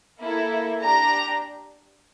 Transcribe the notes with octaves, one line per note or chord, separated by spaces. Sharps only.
A#3 E4 A4
D4 G4 A#5